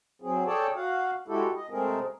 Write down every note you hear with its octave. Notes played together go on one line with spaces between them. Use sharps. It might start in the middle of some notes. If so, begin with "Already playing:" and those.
F#3 C4 G#4
G#4 A4 C#5 D5 G5 A5
F#4 F5 F#5
G#3 E4 F#4 G4 A4
D#5
C3 G#3 A3 C4 G#4 A#4